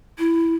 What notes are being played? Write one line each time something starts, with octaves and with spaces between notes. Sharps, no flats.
E4